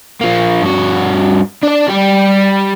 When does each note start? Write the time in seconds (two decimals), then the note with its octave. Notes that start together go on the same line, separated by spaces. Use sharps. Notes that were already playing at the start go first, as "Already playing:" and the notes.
0.21 F3 A#3
0.62 G2 F#4
1.63 D4 D5
1.88 G3 G4